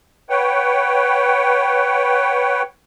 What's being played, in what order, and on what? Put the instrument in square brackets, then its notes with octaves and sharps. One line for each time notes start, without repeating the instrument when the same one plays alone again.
[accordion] B4 C#5 F#5 G5